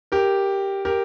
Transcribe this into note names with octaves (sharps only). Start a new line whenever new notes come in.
G4 A#4
G4 A#4